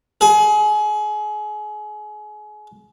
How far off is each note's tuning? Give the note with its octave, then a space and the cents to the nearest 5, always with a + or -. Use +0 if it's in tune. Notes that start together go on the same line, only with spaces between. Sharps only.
G#4 +30